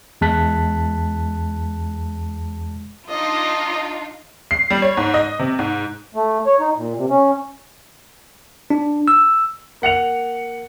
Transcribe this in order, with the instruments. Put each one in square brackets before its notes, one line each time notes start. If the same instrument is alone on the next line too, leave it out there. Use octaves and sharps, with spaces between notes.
[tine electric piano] E2 G#3 A5 F#6 B6
[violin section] D4 D#4 F4 [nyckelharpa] D#5
[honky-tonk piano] C7
G3
C#5
G#2
D#5
C3
G#2
[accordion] A3
C#5
D#4
A#2
C3
C#4
[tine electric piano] D4
E6
[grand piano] A#3 F#5 C#7 F7